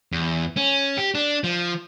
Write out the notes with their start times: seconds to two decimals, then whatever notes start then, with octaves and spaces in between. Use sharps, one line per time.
0.12 E2
0.57 C#4
0.98 G4
1.15 D4
1.44 F3